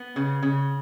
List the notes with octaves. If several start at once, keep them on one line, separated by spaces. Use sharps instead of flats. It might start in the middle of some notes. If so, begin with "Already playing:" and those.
Already playing: B3
C#3
C#3